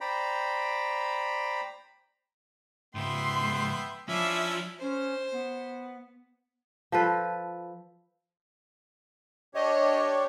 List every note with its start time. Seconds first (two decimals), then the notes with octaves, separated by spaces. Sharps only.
0.01 C5 D5 G5 A#5 B5
2.95 C#2 G#2 B3 E5 G5 C6
4.08 F3 C#4 D4 E4 E5
4.81 C#4 C5
5.32 B3
6.92 F3 A4 B4
9.55 D4 G4 C#5 D#5